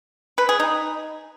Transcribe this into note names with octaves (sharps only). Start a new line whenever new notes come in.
B4
G#4
D#4